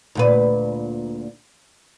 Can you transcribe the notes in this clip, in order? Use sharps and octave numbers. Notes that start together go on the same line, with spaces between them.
D2 A#2 B4